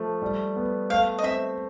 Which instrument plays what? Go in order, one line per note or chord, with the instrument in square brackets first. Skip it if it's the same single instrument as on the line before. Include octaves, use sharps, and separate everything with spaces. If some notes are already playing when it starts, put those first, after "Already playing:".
Already playing: [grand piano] F3 A3
G3
B3
[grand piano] A3 [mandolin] F5
[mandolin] D#5
[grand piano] C4 [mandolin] E5